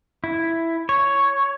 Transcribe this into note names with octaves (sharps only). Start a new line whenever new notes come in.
E4
C#5